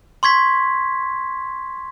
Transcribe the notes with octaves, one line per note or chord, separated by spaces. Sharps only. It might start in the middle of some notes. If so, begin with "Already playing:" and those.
C6 C#6 G#6 B6